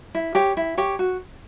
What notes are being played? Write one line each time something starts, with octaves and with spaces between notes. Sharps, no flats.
E4
G4 C#5 G5
E4
G4 C#5 G5
F#4